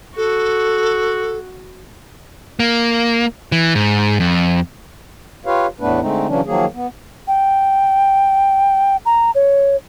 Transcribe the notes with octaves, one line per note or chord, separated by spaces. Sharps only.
F#4 A4
A#3
E3
G#2
F2
F4 G4 B4 C#5 F5
E2 A2 A3 B3 D4 B4
D3 G#3 A3 C4 D#4
C#3 E3 F#3 C#4 D4
D#3 F3 F#3 A#3 G#4
B3
G5
A#5
C#5